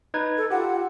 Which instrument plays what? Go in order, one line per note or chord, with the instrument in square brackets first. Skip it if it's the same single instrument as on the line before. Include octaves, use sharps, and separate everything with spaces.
[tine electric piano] D#4 B4 G#6
[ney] A4
[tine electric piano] F4 G4 [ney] F#5